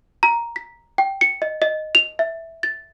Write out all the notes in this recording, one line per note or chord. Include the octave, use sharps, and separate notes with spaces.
A#5
B6
G5
C#7
D#5
D#5
F7
E5
A6